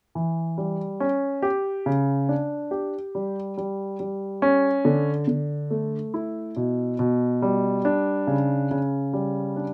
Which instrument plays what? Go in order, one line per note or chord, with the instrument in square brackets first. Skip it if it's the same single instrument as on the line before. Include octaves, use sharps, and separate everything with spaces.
[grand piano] E3
G3
C#4
G4
C#3
D4
G4
G3
G3
G3
C#4
D3
D3
A3
E4
B2
B2
G3
D4
C#3
C#3
G3
D4